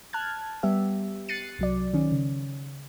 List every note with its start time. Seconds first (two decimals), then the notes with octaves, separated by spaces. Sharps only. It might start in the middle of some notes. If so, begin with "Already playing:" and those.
0.13 A5 F6 F#6 G#6
0.63 G3 B3 G4 E5
1.29 F#6 A6 C7 C#7 D#7
1.59 C2 F#3 D5
1.94 D#3 C#4
2.12 C#3